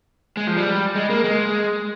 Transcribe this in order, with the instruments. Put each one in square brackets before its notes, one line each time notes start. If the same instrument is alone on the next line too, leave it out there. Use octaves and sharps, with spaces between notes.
[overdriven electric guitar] G#3
F3
G3
G#3
A#3
G#3